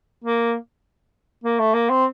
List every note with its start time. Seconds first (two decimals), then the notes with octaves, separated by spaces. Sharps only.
0.24 A#3
1.44 A#3
1.59 A3
1.74 A#3
1.90 C4